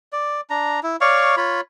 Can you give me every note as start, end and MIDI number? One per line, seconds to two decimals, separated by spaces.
0.13 0.41 74
0.50 0.80 62
0.50 0.80 82
0.83 0.96 64
1.01 1.35 73
1.01 1.35 74
1.01 1.35 77
1.01 1.35 85
1.37 1.61 65
1.37 1.61 73
1.37 1.61 83